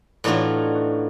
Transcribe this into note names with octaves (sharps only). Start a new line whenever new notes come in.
A2 E3 D4 D#4 F4 F#4